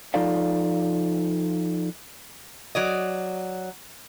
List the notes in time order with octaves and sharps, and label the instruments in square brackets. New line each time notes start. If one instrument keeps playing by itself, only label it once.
[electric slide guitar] F3 D#4 F4 A4 D5 F5
[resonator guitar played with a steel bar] F#3 D5 D#5